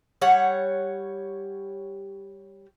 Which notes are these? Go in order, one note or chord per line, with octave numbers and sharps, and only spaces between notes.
G3 C#5 F#5